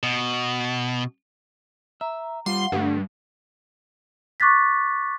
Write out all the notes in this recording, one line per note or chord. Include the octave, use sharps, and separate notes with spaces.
B2
E5 A#5
G3 F4 F5 F#5 C6
G2 D3 G3 A3
C#6 D6 F#6 A6 B6